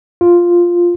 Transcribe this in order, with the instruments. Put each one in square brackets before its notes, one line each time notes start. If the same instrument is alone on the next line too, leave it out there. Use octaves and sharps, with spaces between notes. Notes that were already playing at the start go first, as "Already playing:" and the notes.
[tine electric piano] F4